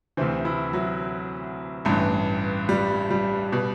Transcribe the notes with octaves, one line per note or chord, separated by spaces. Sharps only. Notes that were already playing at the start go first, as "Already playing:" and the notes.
D2 C3 E3 C4
E4
F#3
A1 G2 E3
G3
G3
B2